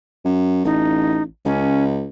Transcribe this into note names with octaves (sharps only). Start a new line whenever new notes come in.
F#2
A1 D#4
C#2 C#4